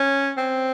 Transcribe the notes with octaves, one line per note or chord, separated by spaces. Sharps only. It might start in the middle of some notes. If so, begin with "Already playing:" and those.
Already playing: C#4
C4